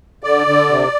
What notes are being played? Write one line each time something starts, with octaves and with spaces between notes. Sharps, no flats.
D3 D5
D3
C3